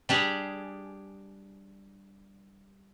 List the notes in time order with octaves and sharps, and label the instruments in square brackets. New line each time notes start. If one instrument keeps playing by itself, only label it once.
[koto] G3 D4 G4 G#4